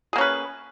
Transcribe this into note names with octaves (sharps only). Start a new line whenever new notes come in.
A#3 C#4 G#4 B4